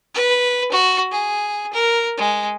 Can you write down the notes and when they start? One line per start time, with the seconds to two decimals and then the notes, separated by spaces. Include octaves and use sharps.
0.15 B4
0.72 F#4
1.11 G#4
1.73 A#4
2.18 G#3